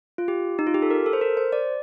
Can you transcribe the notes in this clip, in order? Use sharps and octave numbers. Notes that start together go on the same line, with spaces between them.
F4
G4
D#4
F4
G4
A4
A#4
A4
C5
A#4
C5
D5